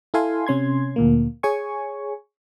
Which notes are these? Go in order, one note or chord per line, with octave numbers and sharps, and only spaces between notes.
E4 A4 F5 G#5 C6
C3 C#4 C6 G#6
D2 A#2 A#3
G#4 C#5 G#5 C#6